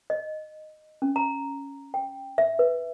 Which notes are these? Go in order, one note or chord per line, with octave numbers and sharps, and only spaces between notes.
D#5
C#4
A#5
G5
E5
B4